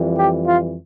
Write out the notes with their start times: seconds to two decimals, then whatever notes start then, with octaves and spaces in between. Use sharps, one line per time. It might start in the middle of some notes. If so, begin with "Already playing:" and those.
Already playing: F2 E3 G3
0.16 G4
0.46 F4